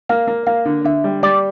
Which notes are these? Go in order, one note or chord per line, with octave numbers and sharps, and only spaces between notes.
A#3 F5
A#3
A#3 F5
D3
D3 E5
G3
G3 D5